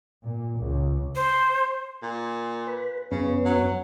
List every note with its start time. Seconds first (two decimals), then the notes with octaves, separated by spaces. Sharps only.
0.23 A#2
0.60 C#2
1.15 C5
2.02 A#2
2.67 B4
3.11 F#2 C#3 B3 C#4
3.45 F#3